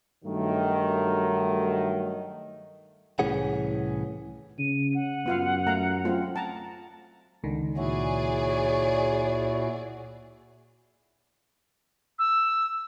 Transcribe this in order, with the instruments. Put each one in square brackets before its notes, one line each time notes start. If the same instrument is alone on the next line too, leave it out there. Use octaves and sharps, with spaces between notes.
[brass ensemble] G2 D#3 F#3 A3
[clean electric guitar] C2 A2 E3 C#4 G#4 F#5
[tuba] C#3 [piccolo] D#7
[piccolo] F#5
[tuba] F#2 [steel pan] B3 F4 F5
[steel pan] A3 F5 A#5
A3 C4 F4
A5 A#5
[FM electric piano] C#2 D#3 [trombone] D3
[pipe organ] A#2 E4 F#4 [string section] G#4 D5 [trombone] C#5
[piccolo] E6